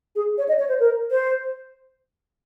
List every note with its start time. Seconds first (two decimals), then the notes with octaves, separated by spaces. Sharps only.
0.16 G#4
0.38 C#5
0.49 D#5
0.59 C#5
0.69 C5
0.80 A#4
1.11 C5